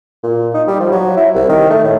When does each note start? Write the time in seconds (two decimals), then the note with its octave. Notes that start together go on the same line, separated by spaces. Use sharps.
0.23 A#2
0.54 D#4
0.67 G3
0.80 F3
0.92 F#3
1.16 E4
1.35 C2
1.49 D#3
1.70 A3
1.84 A2